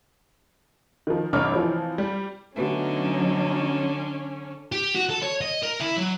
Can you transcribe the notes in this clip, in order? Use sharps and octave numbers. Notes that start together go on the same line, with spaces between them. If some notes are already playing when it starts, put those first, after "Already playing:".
D#3 F3
A1 G2 C3 C#5 D6 F6
E3 F3 C4
G3
D3 F#3 A3 B3 C#4 D#4 F#4
G4
F#4
A4
C#5
D#5
A#4
E4
F#3